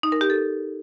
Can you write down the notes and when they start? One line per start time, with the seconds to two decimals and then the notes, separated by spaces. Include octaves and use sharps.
0.03 D#4
0.12 A#4
0.21 G4
0.30 A4